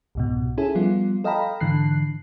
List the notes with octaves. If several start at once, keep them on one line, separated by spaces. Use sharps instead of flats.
C2 G#2 B2
C#4 E4 G#4 A4
F3 G3 B3 F4
A4 D#5 F5 G5 A#5 B5
G#2 D3 E3 F#6 C7